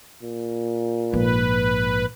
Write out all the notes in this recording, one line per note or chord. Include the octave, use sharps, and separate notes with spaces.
A#2
A#1 G#2 B4